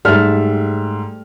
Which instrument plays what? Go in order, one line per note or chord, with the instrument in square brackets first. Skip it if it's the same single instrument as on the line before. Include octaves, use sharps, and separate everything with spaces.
[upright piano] G#2 E5 F6 [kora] G3 A3